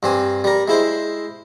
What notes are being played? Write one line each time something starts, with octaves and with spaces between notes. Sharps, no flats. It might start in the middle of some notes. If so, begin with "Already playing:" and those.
G2 C4 G#5
G3 A#4
G#3 E4 C5